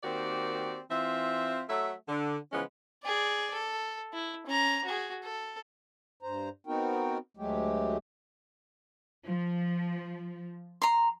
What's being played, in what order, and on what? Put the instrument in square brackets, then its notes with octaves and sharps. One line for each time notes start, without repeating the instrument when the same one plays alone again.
[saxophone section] D#3 A#3 C4 F#4 G4 D5
E3 C4 F4 E5
F#3 A3 E5
D3
C#3 E3 F3 G#3 B3 C#4
[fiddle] G#4 D5
A4
E4
C#4 A#5
F#4 G#4
A4
[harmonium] G2 C5 A#5
B3 C4 D#4 F#4 A#4 G5
D2 F#3 G#3 A3 G4
[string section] F3
[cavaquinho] A#5 C6